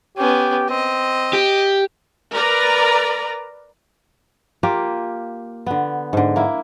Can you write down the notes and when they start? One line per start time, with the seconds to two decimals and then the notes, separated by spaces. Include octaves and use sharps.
0.18 B3 C#4 G4
0.70 C4 D#5
1.33 G4
2.32 A#4 B4 D5 A#5
4.63 A#3 F4 G4
5.66 D3 B3
6.13 G#2 D3
6.36 A#3 E4